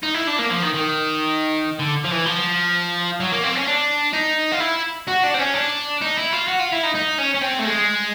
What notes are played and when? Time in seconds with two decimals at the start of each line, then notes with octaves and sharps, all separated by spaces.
0.03 D#4
0.14 E4
0.27 D4
0.38 A#3
0.50 F3
0.62 D#3
0.74 D#3
1.79 D3
2.04 F3
2.11 E3
2.25 F3
3.20 F#3
3.32 A#3
3.43 C4
3.55 C#4
3.67 D4
4.13 D#4
4.52 F4
4.60 E4
5.08 F#4
5.23 D4
5.34 C4
5.38 C#4
5.54 D4
6.01 D#4
6.17 E4
6.32 F4
6.47 F#4
6.59 F4
6.72 E4
6.83 D#4
6.95 D#4
7.18 C#4
7.34 C#4
7.42 C4
7.59 A3
7.65 G#3